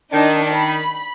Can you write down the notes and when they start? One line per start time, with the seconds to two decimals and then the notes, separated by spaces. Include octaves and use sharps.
0.13 D#3 D4 D#4
0.54 B5